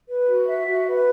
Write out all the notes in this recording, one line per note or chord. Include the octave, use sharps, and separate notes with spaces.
B4
F#4
E5
F#4
B4